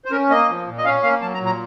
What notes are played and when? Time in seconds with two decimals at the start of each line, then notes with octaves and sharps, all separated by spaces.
0.05 C5
0.11 C#4 A#4
0.30 A#3 D#5
0.49 F3
0.67 A#2
0.78 D#5
0.85 C#4 F5
1.03 A#3 F5
1.22 F#3 A5
1.34 A#5
1.41 A#2
1.46 A#5